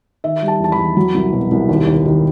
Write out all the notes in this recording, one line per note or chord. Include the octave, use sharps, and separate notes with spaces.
D#3 E5
G3
A5
E2 A5
B5
E2
F#3
C2
B2
C2
D#2
D#2
D#3